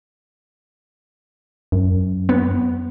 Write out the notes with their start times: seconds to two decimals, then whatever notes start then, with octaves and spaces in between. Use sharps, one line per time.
1.72 F#2
2.29 B3